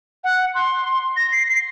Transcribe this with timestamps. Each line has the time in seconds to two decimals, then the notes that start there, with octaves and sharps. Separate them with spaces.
0.24 F#5
0.55 C6
1.17 A#6
1.32 C7
1.48 C7